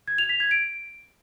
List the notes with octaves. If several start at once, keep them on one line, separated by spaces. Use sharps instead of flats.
G#6
F7
B6
G#6
D7